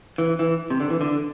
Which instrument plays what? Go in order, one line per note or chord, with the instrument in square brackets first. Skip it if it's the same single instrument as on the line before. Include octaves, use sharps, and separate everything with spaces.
[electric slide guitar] E3
E3
C3
D3
E3
D3